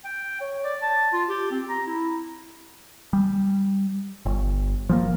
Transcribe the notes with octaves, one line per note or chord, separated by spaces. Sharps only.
G5
C#5
D5
A5
F4
G4
C4
A#5
E4
G3
G1
F3 G3 A#3